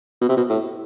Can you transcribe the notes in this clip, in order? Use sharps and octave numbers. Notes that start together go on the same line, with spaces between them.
B2
C3
B2
A2